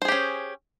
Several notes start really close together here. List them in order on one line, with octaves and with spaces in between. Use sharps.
C5 G#4 G4 C#4